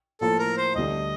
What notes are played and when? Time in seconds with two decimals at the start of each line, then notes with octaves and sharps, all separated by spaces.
0.21 A2 F3 A#3 F4 A4
0.39 A#4
0.57 C5
0.75 D2 D3 G3 D4 D#5